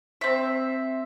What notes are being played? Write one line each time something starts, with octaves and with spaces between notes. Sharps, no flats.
C4 E5